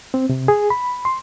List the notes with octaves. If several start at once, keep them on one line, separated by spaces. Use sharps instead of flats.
C4
C3
G#4
B5
C6